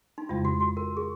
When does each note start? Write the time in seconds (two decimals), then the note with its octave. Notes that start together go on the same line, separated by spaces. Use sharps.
0.18 D#4
0.29 F2 C#3 G#3 F4
0.45 F#4
0.60 F#4
0.77 A#4
0.97 G#4